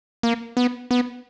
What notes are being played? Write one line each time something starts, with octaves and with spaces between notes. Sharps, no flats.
A#3
B3
B3